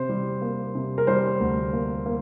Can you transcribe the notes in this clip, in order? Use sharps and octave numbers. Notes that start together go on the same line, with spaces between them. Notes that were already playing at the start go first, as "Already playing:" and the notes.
Already playing: C3 C5
G3
A#3
C3
A#4
G3 C5
D2
A#3
A#3